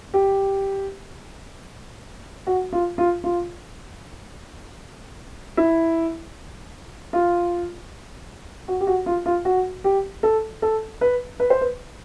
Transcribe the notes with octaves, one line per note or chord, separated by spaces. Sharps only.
G4
F#4
F4
F4
F4
E4
F4
F#4
G4
F#4
F4
F4
F#4
G4
A4
A4
B4
B4
C5
B4